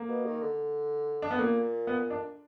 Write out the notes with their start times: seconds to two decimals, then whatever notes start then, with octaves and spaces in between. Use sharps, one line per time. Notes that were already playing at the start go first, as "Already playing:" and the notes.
Already playing: A#3
0.08 B2
0.25 D#3
0.41 D3
1.22 D4
1.31 B3
1.38 A#2 A#3
1.87 B3
2.10 D4